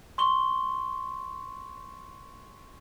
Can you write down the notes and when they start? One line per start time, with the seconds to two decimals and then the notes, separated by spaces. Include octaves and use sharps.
0.18 C6 C#6 G7